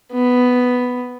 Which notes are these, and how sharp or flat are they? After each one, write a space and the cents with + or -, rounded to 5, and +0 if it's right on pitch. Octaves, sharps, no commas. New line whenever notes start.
B3 +5